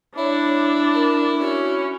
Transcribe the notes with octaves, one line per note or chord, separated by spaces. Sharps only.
D4 E4 C#5
A#4
C#4 F#4